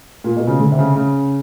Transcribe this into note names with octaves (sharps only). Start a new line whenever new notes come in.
A#2
B2
C#3
D3
C3
C#3
C#3